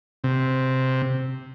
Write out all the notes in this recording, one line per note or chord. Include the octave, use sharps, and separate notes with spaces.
C3